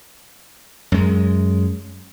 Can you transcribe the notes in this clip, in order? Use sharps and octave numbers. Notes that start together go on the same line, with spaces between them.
F#2 G#3